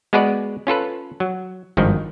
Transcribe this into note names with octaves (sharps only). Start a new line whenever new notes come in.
G#3 B3 F#4 G#4 B4 D5
C#4 F4 A4 B4
F#3
G#1 G2 D#3 F3